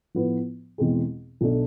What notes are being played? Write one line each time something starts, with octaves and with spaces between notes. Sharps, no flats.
A2 F3 B3 E4 B4
E2 B2 G#3 C4 G#4
B1 B2 A3 D4